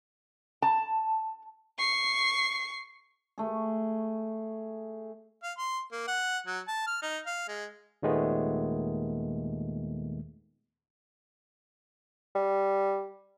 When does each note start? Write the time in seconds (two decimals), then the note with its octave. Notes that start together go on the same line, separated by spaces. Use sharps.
0.62 A5
1.78 C#6 C7
3.38 A3 G#4
5.43 F5
5.58 C6
5.92 A#3
6.08 F#5
6.47 F#3
6.68 A5
6.87 F6
7.02 D#4
7.27 F5
7.48 G#3
8.03 D#2 A#2 D#3 G#3 A3 B3
12.35 G3